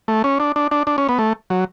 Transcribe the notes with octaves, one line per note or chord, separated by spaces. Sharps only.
A3
C#4
D4
D4
D4
D4
C#4
B3
A3
F#3